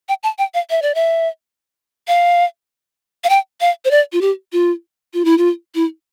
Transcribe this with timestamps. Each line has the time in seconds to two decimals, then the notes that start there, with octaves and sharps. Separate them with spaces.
0.09 G5
0.23 A5
0.38 G5
0.54 F5
0.70 E5
0.82 D5
0.95 E5
2.08 F5
3.24 F5
3.30 G5
3.61 F5
3.85 C5
3.91 D5
4.12 F4
4.21 G4
4.52 F4
5.14 F4
5.25 E4
5.38 F4
5.75 E4